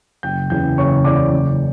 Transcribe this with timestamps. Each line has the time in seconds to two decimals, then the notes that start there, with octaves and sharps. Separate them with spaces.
0.23 F#1 G5 G6
0.50 E2 C#3 E3 G5 G6
0.78 F#1 C#5 C#6
1.04 E2 C#3 E3 D5 D6
1.32 F#1